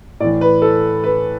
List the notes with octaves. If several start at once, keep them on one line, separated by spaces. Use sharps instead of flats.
A2 E3 D5
B4
A4
B4